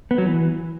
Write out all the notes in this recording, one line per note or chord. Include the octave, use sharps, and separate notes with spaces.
B3
F#3
E3